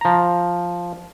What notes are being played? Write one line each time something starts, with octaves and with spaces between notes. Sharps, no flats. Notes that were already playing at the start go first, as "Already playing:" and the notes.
F3 A#5